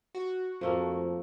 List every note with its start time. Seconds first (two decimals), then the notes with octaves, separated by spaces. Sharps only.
0.15 F#4
0.61 F2 F3 A3 A#3